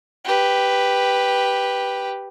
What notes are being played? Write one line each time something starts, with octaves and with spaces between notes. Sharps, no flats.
G4 B4